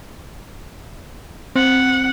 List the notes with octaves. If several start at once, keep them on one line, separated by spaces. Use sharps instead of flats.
C4 F#5